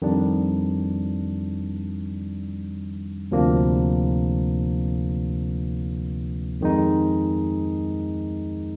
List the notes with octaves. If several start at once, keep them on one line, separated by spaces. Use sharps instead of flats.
F2 D#3 G3 D4
D2 C3 F3 A#3 D4
F2 D#3 G#3 D#4